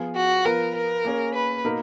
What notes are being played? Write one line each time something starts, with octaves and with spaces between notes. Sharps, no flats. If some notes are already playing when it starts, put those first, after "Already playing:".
Already playing: F3 B3 F4 G#4
F#4
F3 B3 F4 A#4 B4
A#4
A#3 C#4 G#4
B4
B2 A#3 D#4 A#4